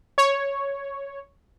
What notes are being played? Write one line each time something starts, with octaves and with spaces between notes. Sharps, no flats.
C#5